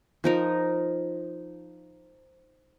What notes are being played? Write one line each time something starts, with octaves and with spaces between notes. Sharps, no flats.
F3 D#4 A#4